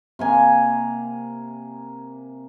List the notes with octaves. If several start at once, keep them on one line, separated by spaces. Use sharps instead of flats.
C3 A#3 G#5 A#5